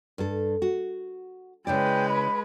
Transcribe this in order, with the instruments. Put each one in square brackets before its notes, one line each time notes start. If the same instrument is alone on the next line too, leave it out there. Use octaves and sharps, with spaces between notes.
[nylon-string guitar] G2 A4
F#4
[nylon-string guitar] C#3 E4 D5 [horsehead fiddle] G#3 B4 [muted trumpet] G5
[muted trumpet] B5